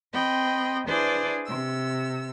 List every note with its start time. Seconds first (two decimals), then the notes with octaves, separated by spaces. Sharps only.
0.13 C4 D#5 G5 B5
0.88 D4 E4 G#4 B4 C5 D5
1.46 C3 E6